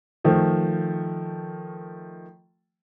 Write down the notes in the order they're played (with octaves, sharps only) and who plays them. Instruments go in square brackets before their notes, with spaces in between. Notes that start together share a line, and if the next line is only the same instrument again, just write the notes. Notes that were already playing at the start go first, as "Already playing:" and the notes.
[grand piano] D#3 F3 A3